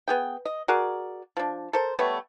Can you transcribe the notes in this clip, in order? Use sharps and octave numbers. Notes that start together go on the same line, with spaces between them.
B3 G#4 G5
D#5
F#4 G#4 A#4 D5
F3 D4
A4 A#4 C5
G3 A3 B3 C#5